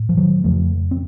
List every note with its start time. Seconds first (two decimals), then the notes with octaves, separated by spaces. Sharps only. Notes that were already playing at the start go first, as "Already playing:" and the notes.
Already playing: A2
0.09 F3
0.17 D#3 F#3
0.44 F2 C#3 F3 A3
0.91 C4